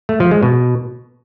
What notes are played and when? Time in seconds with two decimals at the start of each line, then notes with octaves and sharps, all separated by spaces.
0.09 A3
0.20 F3
0.31 G#3
0.43 B2